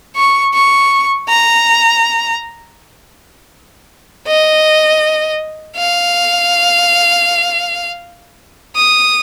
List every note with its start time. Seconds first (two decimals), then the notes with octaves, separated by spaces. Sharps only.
0.16 C#6
0.54 C#6
1.29 A#5
4.27 D#5
5.77 F5
8.76 D#6